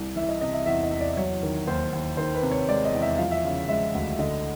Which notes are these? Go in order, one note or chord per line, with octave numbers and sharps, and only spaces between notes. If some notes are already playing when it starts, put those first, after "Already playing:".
Already playing: C2
E3 E5
D#5
C3 D#5
E5
E2 E5
D#5
E2
D5
F#3 C#5
D#3
D#2 C5
D#2
D#3 C5
B4
C3
C#5
G#3 D5
D#5
E2
E5
F3 F5
E5
C#3 F5
G#3 E5
D2
D3 D#5